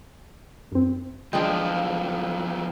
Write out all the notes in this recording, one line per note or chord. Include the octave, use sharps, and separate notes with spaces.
F#2 C4
E2 F3 G#3 D4 G5